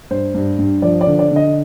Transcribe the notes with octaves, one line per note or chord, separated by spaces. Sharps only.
G2 C5
G2
G2
F3 D5
D5
D3
D5
D3 D#5